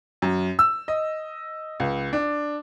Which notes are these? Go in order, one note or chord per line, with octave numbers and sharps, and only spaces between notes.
F#2
E6
D#5
C#2
D4